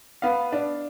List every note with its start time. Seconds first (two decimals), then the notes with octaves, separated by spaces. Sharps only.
0.22 B3 F5
0.52 D4